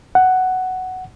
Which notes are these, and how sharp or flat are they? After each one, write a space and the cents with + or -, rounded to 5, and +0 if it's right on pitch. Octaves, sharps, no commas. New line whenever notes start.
F#5 +5